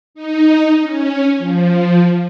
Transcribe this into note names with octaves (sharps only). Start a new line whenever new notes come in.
D#4
C#4
F3